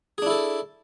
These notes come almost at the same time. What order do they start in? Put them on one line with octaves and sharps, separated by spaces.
G#4 D4 E4 A4